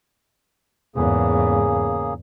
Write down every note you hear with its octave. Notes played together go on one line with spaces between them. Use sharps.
E2 G#2 C#3 A#3 G#4